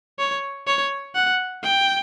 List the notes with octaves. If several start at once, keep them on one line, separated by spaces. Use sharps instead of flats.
C#5
C#5
F#5
G5